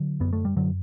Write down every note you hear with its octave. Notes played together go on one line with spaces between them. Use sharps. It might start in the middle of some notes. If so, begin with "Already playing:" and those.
Already playing: D3 F#3
F#2 B3
A3
G3
F#2 D3 F#3